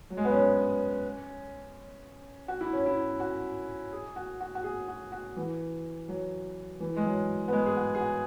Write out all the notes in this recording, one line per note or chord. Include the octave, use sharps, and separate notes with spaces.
F#3
G#3
B3
C#4
F#4
E4
C#4
E4
F#4
G#4
F#4
F#4
F#4
G#4
F#4
F#4
E3
F#3
E3
G#3
F#3
B3
G#3
G#4
F#4
G#4
F#4